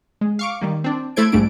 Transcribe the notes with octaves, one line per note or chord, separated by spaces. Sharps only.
G#3
F5 C#6 D6
D#3 G3 A#3
C4 D4
A3 E4 A4 C5 G#6 D7
A#1 G#2 G3 A3 D4 D7